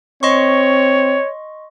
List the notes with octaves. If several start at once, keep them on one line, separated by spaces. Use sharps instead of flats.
C4 C#5 D#5 C6 C#6